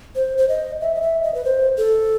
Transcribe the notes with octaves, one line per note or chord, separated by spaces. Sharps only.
C5
C5
D#5
E5
D#5
E5
D#5
B4
C5
A4